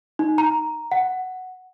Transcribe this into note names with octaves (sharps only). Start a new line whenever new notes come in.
D#4
A#5
F#5